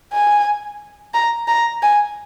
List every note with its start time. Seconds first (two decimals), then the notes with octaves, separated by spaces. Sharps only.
0.13 G#5
1.14 A#5
1.48 A#5
1.82 G#5